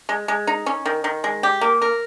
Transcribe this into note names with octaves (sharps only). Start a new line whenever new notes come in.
G#3
G#3
D#4
C#4
D#3
D#3
G#3
G4
A#3
A#4